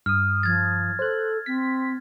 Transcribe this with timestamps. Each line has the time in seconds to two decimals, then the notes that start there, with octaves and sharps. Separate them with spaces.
0.06 G2 D#6 F6
0.43 F3 G#6 A6
0.99 A4 C5 F#6
1.46 C4 B6